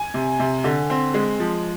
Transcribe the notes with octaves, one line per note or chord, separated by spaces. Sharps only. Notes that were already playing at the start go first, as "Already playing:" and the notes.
Already playing: G#5
C3
C3
D3
C4
G#3
F3